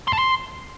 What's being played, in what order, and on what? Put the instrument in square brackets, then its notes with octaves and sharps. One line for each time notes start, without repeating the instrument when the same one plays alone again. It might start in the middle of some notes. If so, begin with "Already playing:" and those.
[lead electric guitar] C6
A5
C6